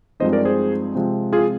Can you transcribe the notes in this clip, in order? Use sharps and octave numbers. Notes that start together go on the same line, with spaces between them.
G2 F3 G#3 C4 D#4 C5 D#5
A#4 D5
G#4 C5
C3 F3 G#3 C4
F4 G#4